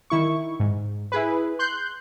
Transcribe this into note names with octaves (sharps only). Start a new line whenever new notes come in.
D#3 E4 C#6
G#2
E4 G#4 B4
C6 F#6 G6